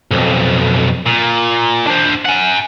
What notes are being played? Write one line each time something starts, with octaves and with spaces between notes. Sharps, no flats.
B1 F2
A#2
D4 C5
F#5 G#5